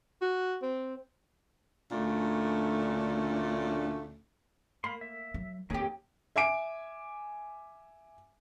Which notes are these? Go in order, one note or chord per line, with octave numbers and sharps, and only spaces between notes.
F#4
C4
D2 A#2 A3 C#4 D4
A#3 F5 B5 C6
E5
F#3
F2 D#3 A#3 C4 C#4 G4 G#4
E5 G#5 D6 D7